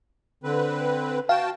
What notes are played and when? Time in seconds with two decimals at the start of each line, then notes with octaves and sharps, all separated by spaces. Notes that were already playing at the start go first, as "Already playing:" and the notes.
0.44 D3 C4 B4
1.29 F#4 F5 G5 A5